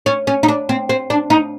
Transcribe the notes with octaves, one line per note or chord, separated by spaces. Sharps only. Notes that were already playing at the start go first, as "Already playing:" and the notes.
C#4
C#4
D#4
D4
C4
C4
D4
D#4